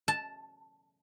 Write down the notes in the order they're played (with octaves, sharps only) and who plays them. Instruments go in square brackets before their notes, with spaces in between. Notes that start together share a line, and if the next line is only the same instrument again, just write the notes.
[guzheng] A5